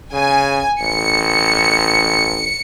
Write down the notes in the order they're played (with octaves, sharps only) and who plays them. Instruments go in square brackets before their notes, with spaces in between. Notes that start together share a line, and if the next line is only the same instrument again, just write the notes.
[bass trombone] C#3 [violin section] G#5
[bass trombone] A1 [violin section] C#7